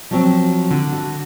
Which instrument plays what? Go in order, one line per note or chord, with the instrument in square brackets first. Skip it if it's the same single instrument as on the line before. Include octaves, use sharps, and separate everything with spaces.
[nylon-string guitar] F3 F#3 C4
[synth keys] D3
[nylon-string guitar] F#4